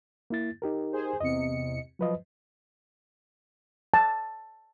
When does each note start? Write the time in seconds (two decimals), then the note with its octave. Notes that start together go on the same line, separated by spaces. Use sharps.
0.30 A#3 E4 A6
0.62 D#4 G4 A#4
0.93 G#4 C5
1.21 E2 C3 D#5 C#7
1.99 F3 F#3 B4 D#5
3.94 A5